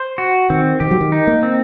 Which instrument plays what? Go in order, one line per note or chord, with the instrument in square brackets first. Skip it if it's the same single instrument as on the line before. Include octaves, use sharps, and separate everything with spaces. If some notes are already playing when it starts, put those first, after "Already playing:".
Already playing: [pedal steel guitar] C5
F#4
[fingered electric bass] D#3 [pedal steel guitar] C4
[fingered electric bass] D#3 [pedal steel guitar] G4
[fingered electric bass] F#3
D#3
[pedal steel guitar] D#4
[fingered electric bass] A#3
[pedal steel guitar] C4